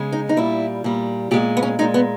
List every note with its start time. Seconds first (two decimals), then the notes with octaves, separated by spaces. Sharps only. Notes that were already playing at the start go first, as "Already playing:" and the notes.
Already playing: C#3 G#3
0.12 D#4
0.29 D#4
0.37 A#2 G3 E4
0.84 A#2 G3
1.31 A#2 G#3 G4
1.57 B3
1.63 C#4
1.79 A#2 G#3 D#4
1.94 B3